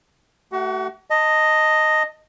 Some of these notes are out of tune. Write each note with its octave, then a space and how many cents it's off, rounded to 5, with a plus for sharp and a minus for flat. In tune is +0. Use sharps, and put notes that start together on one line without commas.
A3 +0 F#4 +40 F#5 +0
D#5 +0 A5 +25